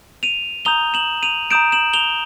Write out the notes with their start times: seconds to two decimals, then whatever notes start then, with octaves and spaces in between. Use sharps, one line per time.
0.23 D#7 F7
0.65 A#5 D#6 G6 F7 G7
0.94 E7 F#7
1.23 D#7 F7
1.51 A#5 D#6 G6 D7 E7
1.72 E7 F#7
1.93 F7 G7